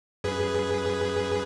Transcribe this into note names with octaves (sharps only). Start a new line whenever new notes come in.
F#2 G#4 B4